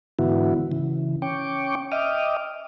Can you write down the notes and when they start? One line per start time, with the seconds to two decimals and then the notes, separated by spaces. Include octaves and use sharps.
0.19 G#2 D3 E3 B3 E4 F#4
0.72 C#3 E3
1.22 C#4 G5 C#6 D6
1.92 D#5 E5 G5 D6 D#6 F6